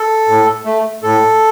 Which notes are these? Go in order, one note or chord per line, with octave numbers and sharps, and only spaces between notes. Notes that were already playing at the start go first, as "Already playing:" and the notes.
Already playing: A4
A2
A3
A2 A4